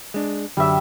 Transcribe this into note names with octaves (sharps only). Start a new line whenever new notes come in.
G#3 D4
F#2 D3 G3 E5